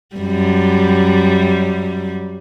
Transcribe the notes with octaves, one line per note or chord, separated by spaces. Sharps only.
F#2 G3